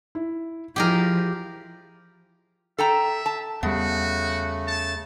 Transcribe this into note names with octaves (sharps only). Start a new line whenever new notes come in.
E4
F3 E4 G4 G#4 A#4 D#5 D#6
A4 E5 G5 A#5
A5
E2 C#3 G3 A3 B3 F#4
A5